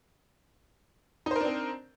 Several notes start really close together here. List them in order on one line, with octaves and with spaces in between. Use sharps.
D#4 C5 A#4 D4 C4